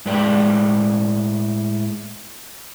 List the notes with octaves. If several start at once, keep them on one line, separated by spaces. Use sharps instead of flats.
A2 G#3 B4 D5 G5